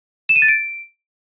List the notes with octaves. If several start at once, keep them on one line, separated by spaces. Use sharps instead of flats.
E7
D#7
A6
D7